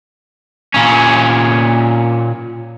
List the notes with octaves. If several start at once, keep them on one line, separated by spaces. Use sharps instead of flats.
A#2 C#4